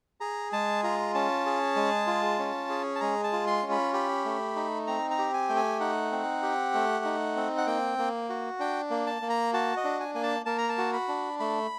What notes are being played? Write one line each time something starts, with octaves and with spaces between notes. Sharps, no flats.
G#4 A#5
G#3 A5
F4 A#5
C#4 A5
G#4
G#3
F4
C#4
G#4
A5
G#3 A#5
A5
F4
C6
C#4
B5
G4 B5
A3
D#4
C4 A#5
A#5
G4
G#5
A3 G5
G#5
D#4 F#5
C4
G4
A3
D#4
C4
F#5
A#3 G5
A#3
F#4
D4 G5
A#3
A5
A#3
A#5
F#4 A5
D#5
D4
G#5
A#3 G#5
A5
A#3 A5
A#5
A5
F#4
B5
D4
A3 B5